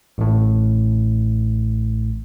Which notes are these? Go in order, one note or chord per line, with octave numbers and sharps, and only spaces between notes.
A1 A2